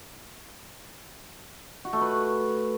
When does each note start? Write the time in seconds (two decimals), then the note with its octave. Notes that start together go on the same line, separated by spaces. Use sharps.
1.85 F#4
1.93 A3
2.01 B4